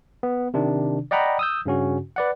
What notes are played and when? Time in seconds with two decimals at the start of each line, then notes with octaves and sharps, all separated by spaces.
0.23 B3
0.54 C3 D#3 D4
1.11 D5 D#5 F#5 G5 A#5 B5
1.39 D#6 E6 G6
1.66 G2 C#3 C#4 F#4
2.16 B4 D5 F#5